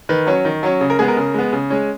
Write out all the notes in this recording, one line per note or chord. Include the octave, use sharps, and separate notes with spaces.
D#3 B4
F#3 C#4
D#3
F#3 C#4
C#3
A#4
G#3 B3 G#4
A#4
C#3
G#3 B3
C#3
G#3 C#4